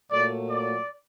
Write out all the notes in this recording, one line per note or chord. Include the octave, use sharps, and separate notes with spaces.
A#2 F#3 A3 D5
D5